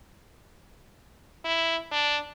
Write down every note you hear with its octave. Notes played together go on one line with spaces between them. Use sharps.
E4
D4